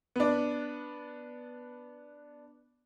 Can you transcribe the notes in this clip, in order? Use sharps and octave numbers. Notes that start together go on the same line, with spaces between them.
B3 D4